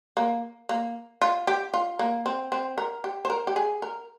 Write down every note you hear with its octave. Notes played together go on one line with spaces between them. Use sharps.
A#3
A#3
F4
G4
F4
A#3
C4
C4
A#4
G4
C5
A#4
G4
G#4
A#4